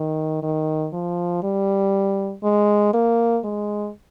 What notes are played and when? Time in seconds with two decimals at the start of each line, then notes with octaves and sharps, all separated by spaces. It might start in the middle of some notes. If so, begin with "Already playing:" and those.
Already playing: D#3
0.43 D#3
0.93 F3
1.43 G3
2.43 G#3
2.94 A#3
3.44 G#3